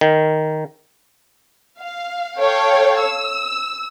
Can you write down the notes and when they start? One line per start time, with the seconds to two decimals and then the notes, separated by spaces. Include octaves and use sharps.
0.01 D#3
1.78 F5
2.37 A4 C#5 F5 G5
3.01 E6